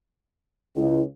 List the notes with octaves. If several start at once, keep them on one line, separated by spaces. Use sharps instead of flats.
C#2 E4